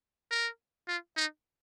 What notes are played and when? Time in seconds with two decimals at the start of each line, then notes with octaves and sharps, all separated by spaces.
0.31 A#4
0.88 F4
1.16 D#4